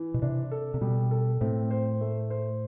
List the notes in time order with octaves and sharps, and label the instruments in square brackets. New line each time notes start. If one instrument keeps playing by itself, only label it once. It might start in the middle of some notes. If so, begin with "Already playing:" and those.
Already playing: [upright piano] E3
[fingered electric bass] B2
[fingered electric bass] C3 [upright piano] D4
[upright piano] A4
[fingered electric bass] C3
[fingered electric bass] B2 [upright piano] G3
[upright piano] A4
[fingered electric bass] A2 [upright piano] C4
[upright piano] C5
A3
C5